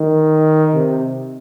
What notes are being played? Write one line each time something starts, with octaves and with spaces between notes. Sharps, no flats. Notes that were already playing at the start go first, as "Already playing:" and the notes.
Already playing: D#3
C3